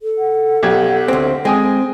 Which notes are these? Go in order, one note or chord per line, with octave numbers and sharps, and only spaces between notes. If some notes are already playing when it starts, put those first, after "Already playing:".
A4
F#5
B1 G4 G#6
D2 C4
G#3 C4 G5 G#5 D#6